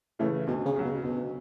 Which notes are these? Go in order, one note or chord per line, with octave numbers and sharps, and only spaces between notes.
A2 C#3 E3 A3
D2 B2
C#3
C#3 F#3
B2
D2 B2